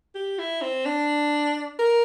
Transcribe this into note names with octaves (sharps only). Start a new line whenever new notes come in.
G4
E4
C4
D4
A#4